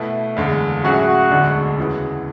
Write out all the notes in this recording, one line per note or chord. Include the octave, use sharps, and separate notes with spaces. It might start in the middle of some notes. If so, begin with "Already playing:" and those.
Already playing: B2 A3 E4 B4
F#1 E2 D3 G#3
A2 F#3 C#4 E4 F#4 G#4
F#4
E1 D2 D3 G#3 D4
E2 C#3 E3 B3 F#4